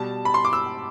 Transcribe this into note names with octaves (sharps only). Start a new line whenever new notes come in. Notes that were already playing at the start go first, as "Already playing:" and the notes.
Already playing: B2 G3 A5
B5
C6
D6
E6